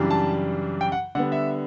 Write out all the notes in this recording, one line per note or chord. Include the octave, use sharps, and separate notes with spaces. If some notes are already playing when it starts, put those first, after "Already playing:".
Already playing: F#2 C#3 E3 G3 D4
A5
G5
F#5
D3 G3 B3 F#5
E5